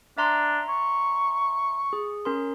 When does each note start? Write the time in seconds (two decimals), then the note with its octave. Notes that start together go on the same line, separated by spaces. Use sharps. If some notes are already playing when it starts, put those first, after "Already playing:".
0.18 D4 E5 A#5 C6
0.69 C#6
1.93 G#4
2.25 C#4 A#4 C6